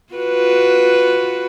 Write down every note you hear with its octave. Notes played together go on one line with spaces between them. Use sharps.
F4 F#4 B4